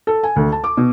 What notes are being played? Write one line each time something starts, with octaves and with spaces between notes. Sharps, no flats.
A4
G#5
D2
A5
D6
B2